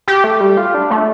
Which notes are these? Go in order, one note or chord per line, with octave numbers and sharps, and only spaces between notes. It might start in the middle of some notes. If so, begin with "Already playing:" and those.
G4
A3
G3
F4
D4
A3